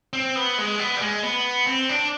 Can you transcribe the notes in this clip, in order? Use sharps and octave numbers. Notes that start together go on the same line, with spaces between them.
C4
B3
G#3
B3
G3
G#3
B3
C4
D4